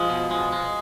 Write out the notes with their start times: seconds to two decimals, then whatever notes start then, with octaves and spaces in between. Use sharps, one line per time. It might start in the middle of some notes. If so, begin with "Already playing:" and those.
Already playing: F3 G#3
0.09 B2
0.31 G#3
0.52 G#3